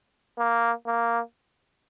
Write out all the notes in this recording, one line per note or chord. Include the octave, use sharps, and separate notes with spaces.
A#3
A#3